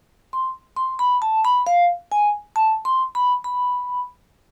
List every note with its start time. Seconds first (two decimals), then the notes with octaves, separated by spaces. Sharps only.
0.33 C6
0.76 C6
0.99 B5
1.22 A5
1.45 B5
1.67 F5
2.12 G#5
2.56 A5
2.85 C6
3.15 B5
3.44 B5